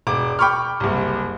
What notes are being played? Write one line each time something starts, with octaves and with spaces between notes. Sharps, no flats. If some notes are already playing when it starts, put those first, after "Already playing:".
E1 D6
G5 B5 C#6 D6 F6
F#1 C2